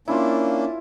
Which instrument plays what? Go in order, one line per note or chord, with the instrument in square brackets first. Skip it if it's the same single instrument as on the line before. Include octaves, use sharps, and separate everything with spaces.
[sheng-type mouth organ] A#3 C#4 D4 [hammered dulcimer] E4 F4